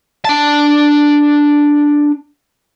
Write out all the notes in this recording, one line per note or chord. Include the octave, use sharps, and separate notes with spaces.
D4 A5